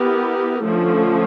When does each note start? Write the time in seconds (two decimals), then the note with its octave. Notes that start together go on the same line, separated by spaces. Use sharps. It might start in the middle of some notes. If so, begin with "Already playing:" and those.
Already playing: B3 E4 G4 A#4
0.64 D3 F3 A3 C#4